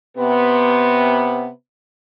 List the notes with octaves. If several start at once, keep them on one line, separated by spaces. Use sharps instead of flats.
C3 B3